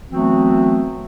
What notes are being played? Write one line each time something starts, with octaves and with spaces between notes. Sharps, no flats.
E3 F#3 A3 B3 C4 F#4